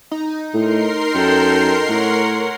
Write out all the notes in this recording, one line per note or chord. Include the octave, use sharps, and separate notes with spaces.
D#4
A2 A#4 C6 C7
F#2 A4 G5
A2 C#5 F#5